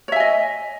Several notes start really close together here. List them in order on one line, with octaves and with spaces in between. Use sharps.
C#5 E5 G#5 D#5